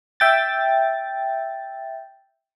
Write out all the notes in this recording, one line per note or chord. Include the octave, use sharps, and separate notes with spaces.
E5 G5 A6